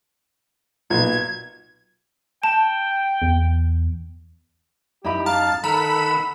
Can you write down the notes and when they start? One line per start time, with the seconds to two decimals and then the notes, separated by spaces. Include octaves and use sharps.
0.90 B1 A#2 G#6
2.43 G5 A5
3.22 E2
5.05 F#2 D#4 E4 G4 D#5 B5
5.26 F5 A5 A#5
5.64 D#3 A4 A#4 F#5 A#5 B5 E6